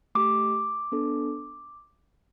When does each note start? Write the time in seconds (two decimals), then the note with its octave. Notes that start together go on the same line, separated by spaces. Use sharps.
0.15 A3 G4 D6
0.92 B3 D4 A4